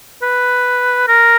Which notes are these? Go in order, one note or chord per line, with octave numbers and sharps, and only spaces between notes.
B4
A#4